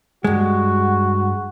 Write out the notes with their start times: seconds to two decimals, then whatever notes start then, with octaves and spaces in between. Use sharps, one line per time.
0.24 G2 G#3 F#4